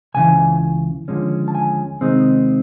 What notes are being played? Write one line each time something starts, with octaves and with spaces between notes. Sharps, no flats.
C#2 C#3 E3 G#5
D#2 D3 F3 G#3 C#4
A5
G#5
C3 D#3 G#3 C4 D#4